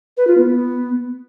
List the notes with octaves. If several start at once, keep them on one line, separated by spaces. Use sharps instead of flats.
B4
F4
B3